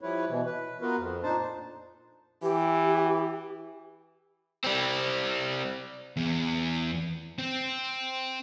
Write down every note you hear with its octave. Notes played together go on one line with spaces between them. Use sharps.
F3 G3 E4 B4 C#5
B2 E3
B4
B3 F4 F#4 A#4 B4
F2
A#2 D4 D#4 C5 A5
E3 G4
G3 C4
E2
C4